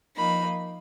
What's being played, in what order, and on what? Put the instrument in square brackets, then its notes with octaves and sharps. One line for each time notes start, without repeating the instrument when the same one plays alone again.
[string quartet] F3 A#3 D#4 [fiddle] B5